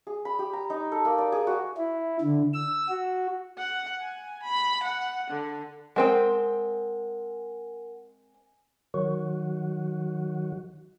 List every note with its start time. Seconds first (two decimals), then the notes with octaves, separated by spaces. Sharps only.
0.07 G#4
0.25 B5
0.39 G4
0.53 A#5
0.70 D#4
0.92 A4
1.05 A#3
1.18 D5
1.32 G#4
1.47 F#4
1.77 E4
2.21 D3
2.53 E6
2.89 F#4
3.58 F#5
4.02 G#5
4.43 B5
4.83 F#5
5.30 D3
5.96 G#3 C4 A#4 F#5 G5
8.94 D#3 F#3 F#4